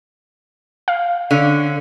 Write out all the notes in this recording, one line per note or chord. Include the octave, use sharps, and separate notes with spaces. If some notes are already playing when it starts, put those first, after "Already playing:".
F5
D3 C#4